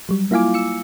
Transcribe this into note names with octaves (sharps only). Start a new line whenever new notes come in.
F#3 G3
A#3 E4 F4 F5 G#5 D6
E6 C#7